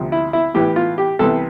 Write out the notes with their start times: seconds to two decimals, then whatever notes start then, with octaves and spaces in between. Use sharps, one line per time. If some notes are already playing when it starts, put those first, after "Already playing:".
Already playing: D2 C3 F3 C4
0.12 E4
0.33 E4
0.54 A2 E3 B3 G4
0.76 F4
0.98 G4
1.19 C2 C3 E3 B3 A4